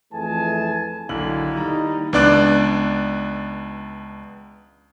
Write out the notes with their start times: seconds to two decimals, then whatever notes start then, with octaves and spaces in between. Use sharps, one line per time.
0.13 F2 E3 A3 G#4 G#5 A5
1.09 B1 D3 D#3 A#3 E4 F#7
1.54 G3 D#4 A#5
2.13 C#2 B3 D4 D5 D6 F#6